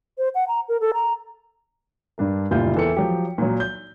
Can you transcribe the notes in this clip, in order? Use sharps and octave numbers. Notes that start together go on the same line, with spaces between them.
C5
F#5
A#5
A#4
A4
A#5
G2 D4 A#4
F#1 D2 A#2 G3 F4 G6
E2 E3 A4 A#4 G5 C#7
F3 F#3 G4
A#2 F#3
G6